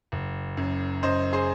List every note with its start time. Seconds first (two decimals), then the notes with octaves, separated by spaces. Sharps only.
0.12 F#1
0.57 F#2
1.03 F#2 C5 D#5
1.33 G#4 C5